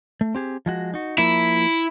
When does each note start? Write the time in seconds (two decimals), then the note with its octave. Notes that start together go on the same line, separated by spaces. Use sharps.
0.21 A3
0.35 C4 G4 G#4
0.66 F3 G#3 F#4
0.94 D#4 F#4
1.18 F3 A#3 E4